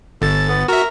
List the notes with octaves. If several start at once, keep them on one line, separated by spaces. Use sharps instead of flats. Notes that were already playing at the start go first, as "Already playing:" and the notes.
G1 A4 A6
B3
F#4 A#4 E5